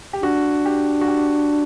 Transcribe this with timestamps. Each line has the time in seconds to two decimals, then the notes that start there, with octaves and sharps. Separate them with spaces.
0.13 G4
0.23 D4 F#4
0.66 G4
1.01 F#4
1.08 G4